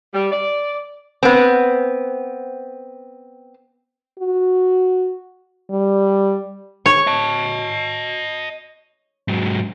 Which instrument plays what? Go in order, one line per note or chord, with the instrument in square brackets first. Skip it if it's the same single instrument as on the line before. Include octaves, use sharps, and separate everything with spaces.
[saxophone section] G3
D5
[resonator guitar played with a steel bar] B3 C4
[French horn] F#4
G3
[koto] C#5
[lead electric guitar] D#5 A5
G#2 F#3